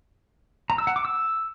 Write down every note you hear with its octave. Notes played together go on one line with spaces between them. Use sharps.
A#5
E6
F#5
D6
E6